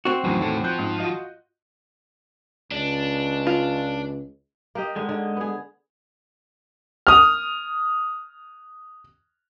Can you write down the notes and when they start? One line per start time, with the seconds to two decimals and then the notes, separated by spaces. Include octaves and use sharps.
0.05 C4 F#4
0.24 E2 A2 D#3 F#3
0.42 A2 A4
0.64 F3 F#6 G6
0.78 G#2
1.00 F4 F#4 D#5
2.72 C#2 D4
3.47 F4
4.75 A#3 G4 D#5
4.96 D3 G#3
5.09 D3
5.37 B3 G#4
7.07 D#6 F6